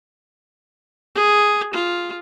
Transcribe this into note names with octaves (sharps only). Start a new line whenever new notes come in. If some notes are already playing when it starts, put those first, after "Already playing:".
G#4
F4